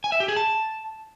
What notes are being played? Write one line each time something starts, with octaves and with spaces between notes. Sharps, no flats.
G#5
E5
G4
G#4
A5